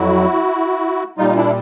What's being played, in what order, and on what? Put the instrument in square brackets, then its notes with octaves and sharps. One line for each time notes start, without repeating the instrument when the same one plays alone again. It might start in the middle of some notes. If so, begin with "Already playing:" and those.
Already playing: [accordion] F2 F#3 E4 F#4
A#2 G3 D#4 F4
F4
D4 E4